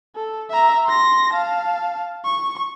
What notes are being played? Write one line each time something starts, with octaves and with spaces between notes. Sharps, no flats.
A4
E5 A#5
C6 A#6
F5 A5
C#6